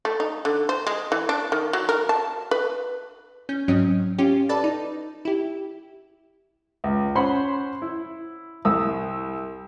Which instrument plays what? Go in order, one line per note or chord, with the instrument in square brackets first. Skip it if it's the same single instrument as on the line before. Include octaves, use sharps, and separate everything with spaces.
[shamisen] A3
D#4
D3
C5
G#3
E3
D4
D#3
F#3
A#4
A5
B4
[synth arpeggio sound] C#4 G6
G#2 F#3 C4 C#4 D#5
C#4 F4 G4
A4 B4 D5 A5
D#4
E4 G4
[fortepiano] C#2
C#4 C5 F#5 B5 C6
E4
C2 D#6 E6